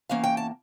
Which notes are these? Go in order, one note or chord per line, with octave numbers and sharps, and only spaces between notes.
E2 E3 A#3 C#4 F5
G5
A5